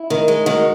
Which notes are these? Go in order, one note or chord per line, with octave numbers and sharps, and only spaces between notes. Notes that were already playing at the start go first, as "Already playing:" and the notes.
Already playing: E4
D#3
G#3
D#3 F#4